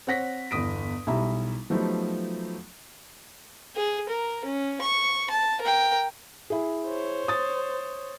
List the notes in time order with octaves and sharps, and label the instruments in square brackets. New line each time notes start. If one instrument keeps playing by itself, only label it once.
[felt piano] C4 C#5 F#5 A#6 B6
G1 E2 B3 D#6 B6 D7
B1 G3 E4 E5 A#5
F3 F#3 A3 B3 D#4 G4
[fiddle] G#4
A#4
C#4
C#6
A5
A#4 G5
[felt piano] E4 G#4
[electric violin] C5 C#5
[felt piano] D#6 A6